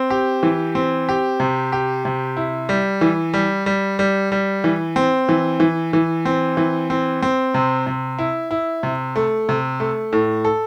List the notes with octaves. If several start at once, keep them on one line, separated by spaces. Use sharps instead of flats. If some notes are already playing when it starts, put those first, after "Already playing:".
Already playing: C4
G4
E3
C4
G4
C3
G4
C3
E4
G3
E3
G3
G3
G3
G3
E3
C4
E3
E3
E3
C4
E3
C4
C4
C3
C3
E4
E4
C3
A3
C3
A3
A2
A4